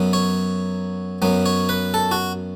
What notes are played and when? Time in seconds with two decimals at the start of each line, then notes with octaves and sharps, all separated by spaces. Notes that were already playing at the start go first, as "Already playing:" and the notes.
Already playing: F#2 F#3 B3
0.13 C#5
1.22 F#2 F#3 B3
1.46 C#5
1.69 B4
1.94 A4
2.11 F#4